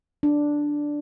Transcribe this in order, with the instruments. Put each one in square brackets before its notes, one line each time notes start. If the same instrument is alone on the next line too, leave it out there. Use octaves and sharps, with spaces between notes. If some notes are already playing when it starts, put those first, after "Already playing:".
[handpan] D4